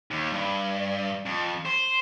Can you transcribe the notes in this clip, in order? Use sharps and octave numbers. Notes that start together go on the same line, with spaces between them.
D#2
G2
F2
C5